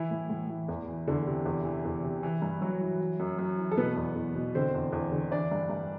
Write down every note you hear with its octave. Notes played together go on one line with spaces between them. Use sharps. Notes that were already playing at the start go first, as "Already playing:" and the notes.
Already playing: E3 E4
A2
A2
E3
E2
E3
E2 D3 D4
C3
E2
E3
E2
C3
E3
G2
G2 F#3 F#4
E3
E3
F#2
F#2
E3
A4
B2 B3 B4
E2
E2
B2
D3 C4 C5
E2
E2
D3
E3 D4 D5
G2
G2